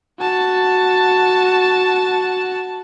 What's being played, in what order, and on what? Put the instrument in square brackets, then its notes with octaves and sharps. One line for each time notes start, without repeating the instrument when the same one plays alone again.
[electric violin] F#4 A5